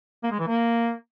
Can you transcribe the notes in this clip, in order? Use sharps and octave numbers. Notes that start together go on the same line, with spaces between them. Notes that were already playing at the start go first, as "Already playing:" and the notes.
A#3
G#3
E3
A#3